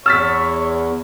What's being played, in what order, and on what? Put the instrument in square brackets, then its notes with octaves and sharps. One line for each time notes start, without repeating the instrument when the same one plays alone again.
[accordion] E2 [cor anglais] C#5 [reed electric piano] E6 [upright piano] F6 A6 B6